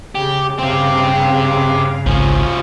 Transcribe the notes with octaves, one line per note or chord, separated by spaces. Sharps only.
C#3 G4
G2 C#3 C4 G4 F5
G#1 C#2 F3 C#4